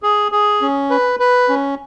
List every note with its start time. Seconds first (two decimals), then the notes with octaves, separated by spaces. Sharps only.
0.03 G#4
0.32 G#4
0.62 C#4
0.90 B4
1.20 B4
1.49 C#4